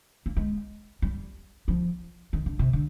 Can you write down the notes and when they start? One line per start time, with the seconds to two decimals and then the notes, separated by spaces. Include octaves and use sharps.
0.26 A#3
0.37 G#3
1.02 G3
1.68 F3
2.33 D#3
2.46 D3
2.59 C3
2.73 D3